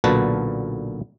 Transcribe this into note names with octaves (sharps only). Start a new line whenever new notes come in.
B1 A#2 D3 F#4 B4 A5